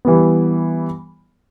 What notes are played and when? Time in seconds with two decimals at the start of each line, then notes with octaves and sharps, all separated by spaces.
0.05 E3 G3 B3